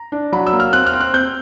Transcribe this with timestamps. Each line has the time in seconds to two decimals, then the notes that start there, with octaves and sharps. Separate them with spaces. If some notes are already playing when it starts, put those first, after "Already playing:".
Already playing: A#5
0.12 D4
0.32 F#3 B5
0.47 E6
0.53 A#3
0.60 F6
0.73 C4 F#6
0.86 F6
0.93 C4
1.00 F#6
1.14 C4 G6